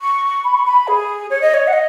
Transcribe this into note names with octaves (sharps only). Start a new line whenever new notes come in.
C#6
B5
C#6
B5
G#4
C#5
D#5
C#5
F#5
D#5